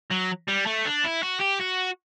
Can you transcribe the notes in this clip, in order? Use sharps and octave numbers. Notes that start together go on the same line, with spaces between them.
F#3
G3
A3
D4
E4
F#4
G4
F#4